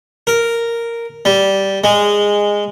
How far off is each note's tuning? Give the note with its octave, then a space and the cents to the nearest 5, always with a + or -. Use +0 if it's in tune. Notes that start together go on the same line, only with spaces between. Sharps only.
A#4 -5
G3 -10
G#3 -15